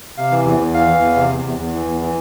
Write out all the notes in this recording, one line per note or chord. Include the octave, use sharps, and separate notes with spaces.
C3 F5
E3
E2
E2
E3 F5
E3
E2
C3
E2
E2
E2
E3
E2
E3